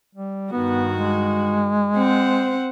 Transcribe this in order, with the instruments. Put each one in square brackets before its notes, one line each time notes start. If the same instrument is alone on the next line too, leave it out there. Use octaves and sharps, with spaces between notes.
[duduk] G3
[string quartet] G2 D#3 F#4 [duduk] B3
[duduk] G#3
[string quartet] C4 C5 F#5